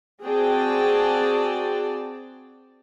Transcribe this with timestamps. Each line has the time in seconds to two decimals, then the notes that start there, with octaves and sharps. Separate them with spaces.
0.24 C4 F#4 G#4 D5 G5 A5